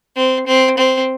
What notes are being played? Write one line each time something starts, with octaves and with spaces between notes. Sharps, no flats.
C4
C4
C4